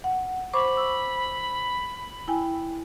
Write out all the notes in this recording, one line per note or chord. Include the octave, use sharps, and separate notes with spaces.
F#5
C5 B5 C#6 D6
E6
E4 G5 G#5